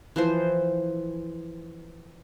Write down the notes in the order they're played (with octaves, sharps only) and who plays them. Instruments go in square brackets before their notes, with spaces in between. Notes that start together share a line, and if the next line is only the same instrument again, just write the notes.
[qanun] E3 F3 C5